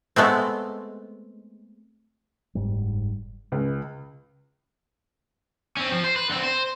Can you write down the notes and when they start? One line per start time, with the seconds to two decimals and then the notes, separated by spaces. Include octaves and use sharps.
0.16 G#3 A3 B3 C4
2.55 F#1 G#2 G3
3.52 C#2
5.77 C4 C#4
5.92 F3
6.04 C5
6.16 B4
6.30 D3 C4
6.43 C5